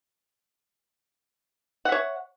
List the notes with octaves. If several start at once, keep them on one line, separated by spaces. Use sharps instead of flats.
C#5 E5 F#5